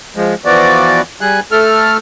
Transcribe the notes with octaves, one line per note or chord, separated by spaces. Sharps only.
F3 G#3
E3 F3 B3 F#4 D5
G3 G#4 F#6
A3 A4 F6